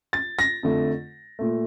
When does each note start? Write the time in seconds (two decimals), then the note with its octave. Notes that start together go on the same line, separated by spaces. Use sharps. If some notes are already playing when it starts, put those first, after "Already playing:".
0.13 A6
0.39 A#6
0.63 F2 D3 A3
1.39 A#2 A3